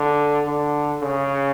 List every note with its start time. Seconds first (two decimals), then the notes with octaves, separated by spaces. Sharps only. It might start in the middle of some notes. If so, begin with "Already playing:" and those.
Already playing: D3
0.46 D3
1.01 C#3